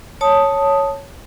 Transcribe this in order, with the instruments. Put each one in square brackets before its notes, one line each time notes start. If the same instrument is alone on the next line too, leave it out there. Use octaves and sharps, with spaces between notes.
[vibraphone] C#5 A5 D#6